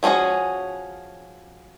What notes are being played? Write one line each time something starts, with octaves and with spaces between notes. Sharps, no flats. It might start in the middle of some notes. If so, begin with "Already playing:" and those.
F3 B3 C#4 F#4 G#4